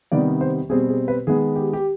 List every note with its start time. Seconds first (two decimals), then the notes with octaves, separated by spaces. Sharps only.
0.12 C3 D#3 G3 B3 D5
0.41 C5
0.69 B2 G3 C4 G#4
0.88 G#4
1.08 B4
1.27 D#3 G#3 B3 G#4
1.56 G4
1.73 G4